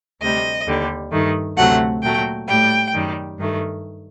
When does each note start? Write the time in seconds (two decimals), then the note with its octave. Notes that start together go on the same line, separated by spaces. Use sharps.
0.21 D2 C3 G3 D#5
0.67 D#2 D3 G3
1.12 G2 D#3 A3
1.57 D2 C3 F#3 A3 F#5
2.03 A#2 F#3 A3 G5
2.48 A2 G3 G5
2.94 F#2 D#3 G3
3.39 G2 D#3 A3